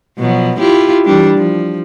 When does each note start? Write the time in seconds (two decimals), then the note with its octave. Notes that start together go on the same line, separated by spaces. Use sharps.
0.18 B2 F3 F#3
0.60 E4 F4 G4
1.05 E3 G3 D4
1.36 F3